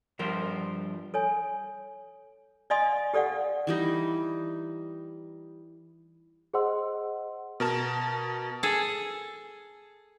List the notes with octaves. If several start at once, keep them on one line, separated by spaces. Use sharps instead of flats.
G2 F3 A#4 C5
A4 C#5 G#5
D5 D#5 F5 G#5 C6 D#6
G4 A4 D5 F5 F#5
E3 G3 D#4
G#4 C5 D#5 F#5 C6 E6
B2 A#4 A5
G#4 A4